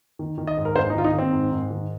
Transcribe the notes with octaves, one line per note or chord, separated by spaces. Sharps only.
D#3
D#3
D#5
G#2
A#4
G#2 C5
D#4
D#3 F4
D#4
D#3 C4
G#2
G#2
D#3